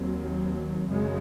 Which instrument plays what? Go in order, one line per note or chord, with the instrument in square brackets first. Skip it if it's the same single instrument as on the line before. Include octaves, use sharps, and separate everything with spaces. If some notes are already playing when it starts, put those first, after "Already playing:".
Already playing: [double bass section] D#2 D#3 F#3 C4
F#2 C#3 G#3